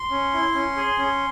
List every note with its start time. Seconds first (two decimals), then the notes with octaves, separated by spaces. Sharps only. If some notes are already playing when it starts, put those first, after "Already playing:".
Already playing: C6
0.10 C#4
0.34 E4
0.55 C#4
0.77 G#4
0.99 C#4